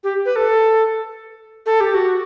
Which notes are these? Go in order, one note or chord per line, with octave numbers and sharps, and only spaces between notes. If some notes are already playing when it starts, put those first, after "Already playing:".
G4
B4
A4
A4
G4
F#4